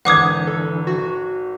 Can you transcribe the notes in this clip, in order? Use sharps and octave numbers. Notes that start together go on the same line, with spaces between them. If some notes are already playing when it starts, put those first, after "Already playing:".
G#1 D3 E3 F#5 D6 D#6 G#6
A4
F#4